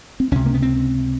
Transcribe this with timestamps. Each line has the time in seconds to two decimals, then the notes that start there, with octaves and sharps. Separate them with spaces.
0.20 C4
0.32 C#2 C3 C#4
0.46 A#3
0.54 B3
0.62 C4